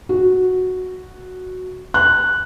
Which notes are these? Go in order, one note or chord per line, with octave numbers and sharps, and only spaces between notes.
F#4
F#6